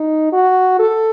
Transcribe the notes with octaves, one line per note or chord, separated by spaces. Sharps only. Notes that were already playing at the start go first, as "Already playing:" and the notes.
Already playing: D#4
F#4
A4